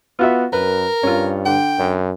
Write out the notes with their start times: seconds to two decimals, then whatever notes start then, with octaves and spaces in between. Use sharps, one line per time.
0.19 B3 F4 F#4 E5
0.53 F#2 A#4 B4
1.03 G2 C#4 F4
1.46 D3 G5
1.78 F#2